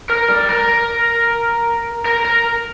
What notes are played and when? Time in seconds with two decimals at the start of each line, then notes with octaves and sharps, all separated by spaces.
0.09 A#4
0.29 G3
0.49 A#4
2.05 A#4
2.25 A#4